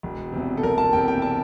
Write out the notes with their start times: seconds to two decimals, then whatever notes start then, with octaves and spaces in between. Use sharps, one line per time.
0.03 E1
0.32 E2 C3
0.57 A4
0.63 E1 A#4
0.78 A5
0.93 E2 C3 G5
1.08 G5
1.22 A5